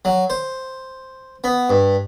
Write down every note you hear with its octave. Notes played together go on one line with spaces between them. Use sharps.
F#3
C5
B3
G2